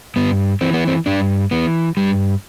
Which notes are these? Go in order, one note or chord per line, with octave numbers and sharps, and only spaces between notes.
G2 B3
E3 C4
B3
C4
G2 D4
E3 B3
G2 G3